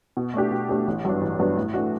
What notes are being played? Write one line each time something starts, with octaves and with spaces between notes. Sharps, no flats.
B2
A3 D4 G4
B2
A3 D4 G4
A1
G2 F#3 B3 D4
A1
G2 F#3 B3 D4
A2
E3 A3 D4 F#4